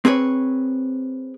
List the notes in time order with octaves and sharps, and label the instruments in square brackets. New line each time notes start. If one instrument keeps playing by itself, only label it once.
[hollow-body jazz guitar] C4 G#4 B4 C#5